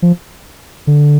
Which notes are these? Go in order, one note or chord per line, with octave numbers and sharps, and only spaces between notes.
F3
D3